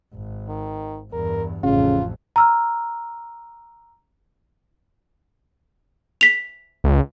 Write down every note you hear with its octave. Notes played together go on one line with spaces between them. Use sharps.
G#1
D#3
E2 G2 A#4
A1 F2 C#3 F4
A#5 E6 F6
B6 F7
C#2